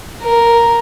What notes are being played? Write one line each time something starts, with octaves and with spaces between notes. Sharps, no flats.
A#4